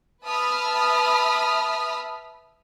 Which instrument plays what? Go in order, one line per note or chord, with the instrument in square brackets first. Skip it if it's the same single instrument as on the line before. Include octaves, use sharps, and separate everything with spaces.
[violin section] B4 E5 A5 B5 D#6 F6